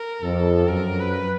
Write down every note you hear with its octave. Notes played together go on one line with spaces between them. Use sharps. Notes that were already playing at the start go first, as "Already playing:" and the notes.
Already playing: A#4
F2 A4
F#2 A#4
B4